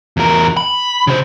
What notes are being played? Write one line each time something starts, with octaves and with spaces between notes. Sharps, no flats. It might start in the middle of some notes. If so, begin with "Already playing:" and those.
E2 A#4
B5
C#3 C5